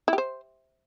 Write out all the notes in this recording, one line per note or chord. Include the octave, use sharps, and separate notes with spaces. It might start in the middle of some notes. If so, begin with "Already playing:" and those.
E4
G4
C5